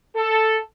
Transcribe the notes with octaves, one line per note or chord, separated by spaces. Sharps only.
A4